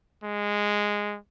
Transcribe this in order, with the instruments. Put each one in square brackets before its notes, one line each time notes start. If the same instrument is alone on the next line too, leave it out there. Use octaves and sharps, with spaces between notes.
[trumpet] G#3